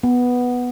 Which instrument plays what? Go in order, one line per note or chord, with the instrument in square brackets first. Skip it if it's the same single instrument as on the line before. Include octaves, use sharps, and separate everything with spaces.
[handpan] B3